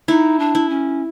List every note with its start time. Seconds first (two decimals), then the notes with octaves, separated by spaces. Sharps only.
0.08 D#4 E4
0.39 D4
0.55 E4
0.69 C#4